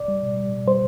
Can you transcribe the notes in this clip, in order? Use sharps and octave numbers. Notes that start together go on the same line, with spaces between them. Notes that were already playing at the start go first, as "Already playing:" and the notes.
Already playing: D5
G3
B2
G3
B2
G3 C5